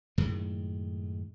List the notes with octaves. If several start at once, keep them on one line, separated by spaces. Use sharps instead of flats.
F#2 A2 D#3 G#3